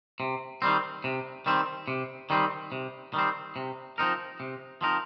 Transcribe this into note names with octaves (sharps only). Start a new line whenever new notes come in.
C3
D#3 G3 C4
C3
D#3 G3 C4
C3
D#3 G3 C4
C3
D#3 G3 C4
C3
F3 C4 D#4 A#4
C3
F3 C4 D#4 A#4